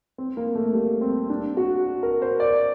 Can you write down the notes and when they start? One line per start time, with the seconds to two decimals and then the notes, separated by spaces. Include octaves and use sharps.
0.18 C4
0.37 A#3
0.55 A3
0.74 G3
1.01 C4
1.30 D4
1.57 F#4
2.03 A#4
2.22 C5
2.40 D5